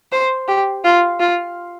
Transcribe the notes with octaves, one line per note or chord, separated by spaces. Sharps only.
C5
G4
F4
F4